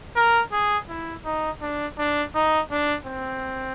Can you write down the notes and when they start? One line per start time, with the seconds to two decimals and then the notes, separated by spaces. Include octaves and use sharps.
0.16 A#4
0.52 G#4
0.89 E4
1.25 D#4
1.62 D4
1.98 D4
2.35 D#4
2.71 D4
3.07 C4